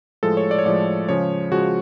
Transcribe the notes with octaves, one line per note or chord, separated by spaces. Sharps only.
A2 F3 G#3 A4
C#5
D5
C#5
A2 F3 G#3 D5
C#3 F3 G#3 C#5
C#3 F3 G#3 F#4